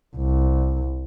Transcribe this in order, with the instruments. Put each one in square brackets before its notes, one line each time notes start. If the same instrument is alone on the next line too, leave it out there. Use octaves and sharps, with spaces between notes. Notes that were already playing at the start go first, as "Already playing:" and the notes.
[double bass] C2